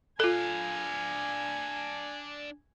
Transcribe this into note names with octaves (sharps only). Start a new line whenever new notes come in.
D4 F4 A4 F5 G#5